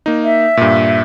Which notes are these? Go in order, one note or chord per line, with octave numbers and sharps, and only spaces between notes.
A#3 D#4
E5
G2 A#2